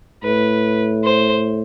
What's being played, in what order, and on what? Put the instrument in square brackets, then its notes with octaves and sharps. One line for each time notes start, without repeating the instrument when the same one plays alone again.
[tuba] A2 [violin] B4
[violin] C5